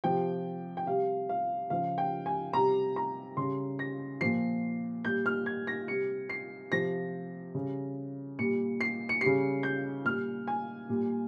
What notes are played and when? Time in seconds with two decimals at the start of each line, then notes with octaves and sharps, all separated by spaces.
0.04 C3 F3 G5
0.77 G5
0.86 C3 G3 F5
1.29 F5
1.70 C#3 F3 F5
1.98 G5
2.26 G#5
2.53 C3 G3 A#5
2.96 A#5
3.37 C#3 G3 C6
3.79 A#6
4.21 A#2 F3 C7
5.04 A#2 G3 G6
5.26 F6
5.46 G#6
5.67 A#6
5.88 C3 G3 C#7
6.30 C7
6.72 C3 F3 A#6
7.54 C#3 G3
8.39 A#2 G3 C#7
8.81 C7
9.09 C#7
9.21 C#3 G3 C7
9.63 G6
10.05 A#2 G3 F6
10.47 G#5
10.89 A#2 G3